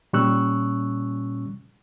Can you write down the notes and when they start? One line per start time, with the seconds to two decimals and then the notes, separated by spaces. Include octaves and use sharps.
0.13 A#2 G3 C#4 C#6 E6 F#6